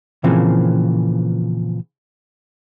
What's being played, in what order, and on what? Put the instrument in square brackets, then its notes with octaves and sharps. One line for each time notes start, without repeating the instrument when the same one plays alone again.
[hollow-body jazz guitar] A#2 C#3 E3 F3 A#3 C4